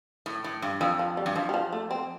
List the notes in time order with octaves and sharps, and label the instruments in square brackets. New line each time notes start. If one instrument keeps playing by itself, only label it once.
[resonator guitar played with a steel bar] A2
A2
G2
[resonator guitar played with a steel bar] F2 [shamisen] F3
[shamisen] F3
G3
[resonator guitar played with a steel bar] G2
[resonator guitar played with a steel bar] F2 [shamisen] F3
[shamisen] G3
F3
A3
C4